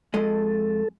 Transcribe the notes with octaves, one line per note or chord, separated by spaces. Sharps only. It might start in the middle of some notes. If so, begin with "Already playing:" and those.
F2 G#3 A4 D#5